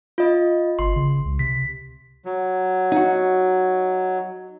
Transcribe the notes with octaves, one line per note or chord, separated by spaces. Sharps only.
F4 D#5
G1 C6
C#3
C#2
C3 B6
F#3
D#4 F#4